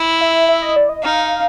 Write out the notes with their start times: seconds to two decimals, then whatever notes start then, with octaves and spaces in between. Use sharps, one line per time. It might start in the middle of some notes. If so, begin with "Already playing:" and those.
Already playing: E4
0.21 E5
0.48 E5
0.62 D#5
0.76 D5
0.89 D#5
1.03 D#4 F5